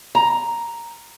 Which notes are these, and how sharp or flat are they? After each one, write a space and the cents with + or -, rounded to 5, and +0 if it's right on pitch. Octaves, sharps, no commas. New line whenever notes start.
A#5 +0